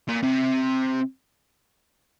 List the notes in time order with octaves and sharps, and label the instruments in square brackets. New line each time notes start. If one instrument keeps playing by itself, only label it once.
[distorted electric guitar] A#2
C3